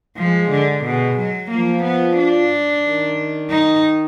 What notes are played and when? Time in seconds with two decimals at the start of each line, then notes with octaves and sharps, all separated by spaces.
0.17 F3 G#3
0.51 D3
0.83 B2 G#3
1.17 F#3
1.50 F3 A#3
1.83 B3
2.17 D4
2.84 D#3
3.50 D#4